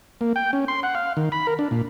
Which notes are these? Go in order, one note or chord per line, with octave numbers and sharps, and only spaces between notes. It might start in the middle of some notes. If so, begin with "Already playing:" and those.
A#3
G5
C#4
C6
F#5
F5
D#3
B5
A#4
D4
A#2